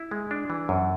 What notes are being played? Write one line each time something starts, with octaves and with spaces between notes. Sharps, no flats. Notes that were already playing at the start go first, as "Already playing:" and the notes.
Already playing: E4
G#3
D4
E3
F#2